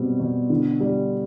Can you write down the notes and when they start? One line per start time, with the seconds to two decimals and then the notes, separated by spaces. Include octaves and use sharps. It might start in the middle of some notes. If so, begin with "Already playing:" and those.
Already playing: B2 G3 C4
0.20 B2
0.50 D3
0.80 G3